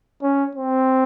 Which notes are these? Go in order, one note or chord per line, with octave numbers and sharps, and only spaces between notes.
C#4
C4